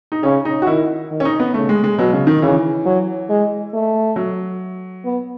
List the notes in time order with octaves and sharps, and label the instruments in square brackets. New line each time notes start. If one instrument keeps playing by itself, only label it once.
[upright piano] D#4
[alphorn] C#3 [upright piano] C#4
[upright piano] D#4
F#4
[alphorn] D#3 [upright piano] E4
[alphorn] D#3
[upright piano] C#4
D#4
B3
[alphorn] C#3 [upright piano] A3
[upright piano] G#3
G#3
[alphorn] B2 [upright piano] F#3
[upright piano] C#3
D#3
[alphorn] C#3 [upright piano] E3
[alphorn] F#3
G#3
A3
[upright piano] F#3
[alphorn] B3